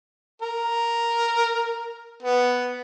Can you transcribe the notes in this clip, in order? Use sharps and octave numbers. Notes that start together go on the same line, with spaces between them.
A#4
B3